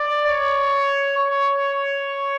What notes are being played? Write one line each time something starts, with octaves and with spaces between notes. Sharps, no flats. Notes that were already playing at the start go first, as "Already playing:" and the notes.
Already playing: D5
C#5
C#5